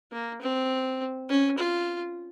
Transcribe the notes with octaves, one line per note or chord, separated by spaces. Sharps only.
A#3
C4
C#4
F4